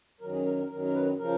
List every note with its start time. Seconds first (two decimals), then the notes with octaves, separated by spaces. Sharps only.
0.21 F#2 D#3 F#3 A#4
0.33 G#4
0.46 A#4
0.58 A#4
0.69 F#2 D#3 F#3 A#4
0.85 A#4
0.94 B4
1.19 C#3 F3 A#4